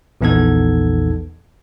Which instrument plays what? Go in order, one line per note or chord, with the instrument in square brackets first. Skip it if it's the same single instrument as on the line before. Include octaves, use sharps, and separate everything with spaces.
[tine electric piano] A#1 E2 B3 D#4 A4 G#6